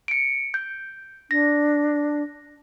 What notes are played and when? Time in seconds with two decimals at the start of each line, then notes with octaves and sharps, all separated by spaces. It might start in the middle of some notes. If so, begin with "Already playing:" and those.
0.08 C#7 D7
0.54 G6
1.31 D4 A#6